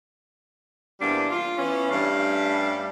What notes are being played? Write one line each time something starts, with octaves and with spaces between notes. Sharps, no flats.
E2 C3 G3 A#3 D4
F4
E3 B3 C#4
G2 G3 A3 C#4 F5